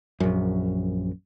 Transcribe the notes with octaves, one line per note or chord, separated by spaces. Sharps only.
A#1 F#2